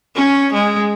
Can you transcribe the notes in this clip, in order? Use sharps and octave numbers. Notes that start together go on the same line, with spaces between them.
C#4
G#3